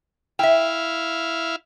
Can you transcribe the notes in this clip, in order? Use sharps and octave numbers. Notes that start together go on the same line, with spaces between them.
E4 E5 F5 G5